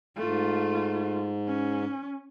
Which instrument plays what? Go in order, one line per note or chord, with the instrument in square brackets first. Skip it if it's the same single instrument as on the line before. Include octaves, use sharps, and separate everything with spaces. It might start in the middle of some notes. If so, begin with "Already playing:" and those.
[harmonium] G#2 [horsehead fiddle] A3 F4
[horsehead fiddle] C#4